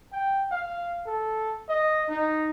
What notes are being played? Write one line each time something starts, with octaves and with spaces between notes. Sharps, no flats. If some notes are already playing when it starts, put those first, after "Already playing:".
G5
F5
A4
D#5
D#4